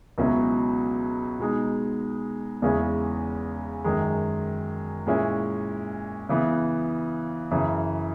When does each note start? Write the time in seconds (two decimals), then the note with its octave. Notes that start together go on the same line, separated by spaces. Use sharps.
0.18 C#2 B2 F#3 C#4 E4
1.39 B2 G#3 D#4
2.62 E2 C#3 G#3 C#4 E4
3.84 F#2 D#3 G#3
5.06 A#2 G#3 C#4 E4
6.29 C#3 E3 B3
7.51 F#2 C#3 E3